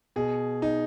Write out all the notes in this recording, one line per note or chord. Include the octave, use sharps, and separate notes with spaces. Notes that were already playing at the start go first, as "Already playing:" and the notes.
B2 G#4
D#4